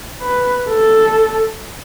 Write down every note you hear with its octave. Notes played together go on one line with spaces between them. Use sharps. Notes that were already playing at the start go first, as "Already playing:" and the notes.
B4
A4